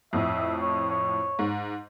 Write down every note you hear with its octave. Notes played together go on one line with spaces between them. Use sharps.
F2 A2 E5
C#5
C#5
G#2